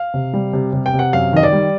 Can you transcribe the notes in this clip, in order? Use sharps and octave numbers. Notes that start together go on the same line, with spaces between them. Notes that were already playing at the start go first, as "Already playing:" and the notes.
Already playing: F5
C3
G3
C3
C3
G5
C3
F#5
F#2 F5
D#3 D#5
D5
G3